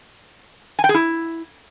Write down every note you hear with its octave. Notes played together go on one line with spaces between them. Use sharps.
G#5
G5
G#4
E4